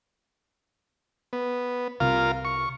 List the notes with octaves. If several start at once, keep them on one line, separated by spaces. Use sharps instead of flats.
B3
C2 C3 F4 A#4 F5
C#6